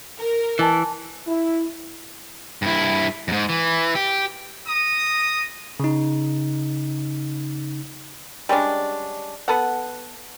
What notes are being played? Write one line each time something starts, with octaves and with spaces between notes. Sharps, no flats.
A#4
E3 D#5 G#5 A5
E4
G2 E4
F2 G#2
E3
G4
A#5 D#6
C#3 D#4
G3 G#3 C#4 D4
B3 A4 F#5